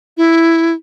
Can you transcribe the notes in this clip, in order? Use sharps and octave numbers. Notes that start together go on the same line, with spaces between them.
E4